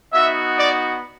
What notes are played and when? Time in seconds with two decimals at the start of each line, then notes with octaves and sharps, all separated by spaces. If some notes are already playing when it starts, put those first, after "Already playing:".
0.12 B3 D#4 F#4 E5
0.57 D5